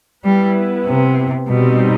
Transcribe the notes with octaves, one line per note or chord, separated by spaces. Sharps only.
G3 B3 E4 B4
C3
B2 G3 C4 D#4